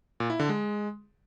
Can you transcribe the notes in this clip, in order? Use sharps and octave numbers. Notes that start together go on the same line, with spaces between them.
A#2
E4
D3
G#3